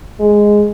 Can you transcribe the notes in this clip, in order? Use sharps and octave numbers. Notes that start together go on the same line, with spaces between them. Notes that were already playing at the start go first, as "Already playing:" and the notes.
G#3